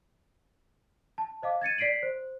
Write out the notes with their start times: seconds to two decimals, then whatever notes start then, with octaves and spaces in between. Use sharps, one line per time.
1.18 A5
1.42 C5 D#5 F5 D6
1.61 G#6 A6 C#7 D#7
1.78 D5 B6 C7 D7 F#7
2.03 C5